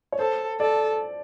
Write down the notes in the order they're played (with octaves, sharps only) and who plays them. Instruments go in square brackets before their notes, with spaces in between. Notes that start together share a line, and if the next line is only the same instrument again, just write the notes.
[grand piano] C#5
[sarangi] A4 [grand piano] C5
[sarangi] A4 [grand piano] D5